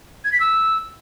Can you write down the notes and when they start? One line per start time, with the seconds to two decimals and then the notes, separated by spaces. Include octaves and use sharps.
0.24 G#6
0.32 B6
0.40 E6